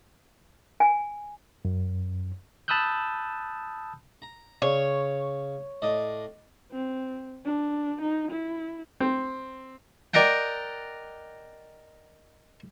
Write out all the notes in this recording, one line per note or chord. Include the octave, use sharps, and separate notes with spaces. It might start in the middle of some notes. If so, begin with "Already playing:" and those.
G#5
F#2
A5 B5 D#6 E6 F#6 G6
A#5
C#3 C#5
A2 D5 D#5
C4
D4
D#4
E4
C4
A#4 D5 D#5 F#5 G5